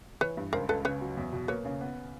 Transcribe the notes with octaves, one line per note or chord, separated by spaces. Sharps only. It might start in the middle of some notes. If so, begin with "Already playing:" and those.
E3 B4 C#5
G2
C#2 A#4 C5
C#2 A4 B4
C#3 B4 C#5
F#3
E2
B2
A#3 B4 C#5
C#3
B3